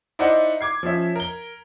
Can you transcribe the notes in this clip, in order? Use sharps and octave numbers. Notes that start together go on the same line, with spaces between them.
D#4 E4 C5 D5 D#5 F#5
D6 G#6 C7
F3 C#4 E5
A#4 G7